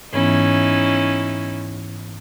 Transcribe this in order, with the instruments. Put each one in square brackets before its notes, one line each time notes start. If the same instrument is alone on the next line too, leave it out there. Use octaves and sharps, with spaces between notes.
[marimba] G#2 E3 B3 [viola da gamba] C#4 D#4 E4